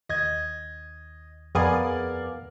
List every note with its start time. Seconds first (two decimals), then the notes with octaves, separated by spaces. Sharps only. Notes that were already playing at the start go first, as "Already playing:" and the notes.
0.09 D#2 D#5 G#6
1.55 F2 B3 G#4 A#4 D5 F5 G#5